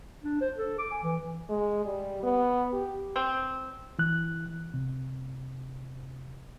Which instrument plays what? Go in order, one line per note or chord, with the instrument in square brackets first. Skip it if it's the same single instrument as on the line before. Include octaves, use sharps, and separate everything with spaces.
[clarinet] D4
C5
A4
D6
G#5
E3
[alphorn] G#3
G3
B3
G4
[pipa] C4
[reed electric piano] E3 F#6
C3